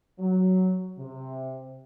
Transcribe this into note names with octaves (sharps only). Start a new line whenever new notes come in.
F#3
C3